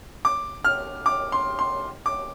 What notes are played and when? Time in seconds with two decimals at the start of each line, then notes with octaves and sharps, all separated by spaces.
0.25 D6
0.65 F6
1.06 D6
1.32 C6
1.59 C6
2.06 D6